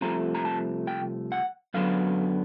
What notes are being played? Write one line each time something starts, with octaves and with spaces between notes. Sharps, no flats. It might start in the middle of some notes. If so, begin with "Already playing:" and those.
C2 C3 F3 A3 A#5
A#5
A5
G5
F#5
F#2 D3 F#3 B3 F5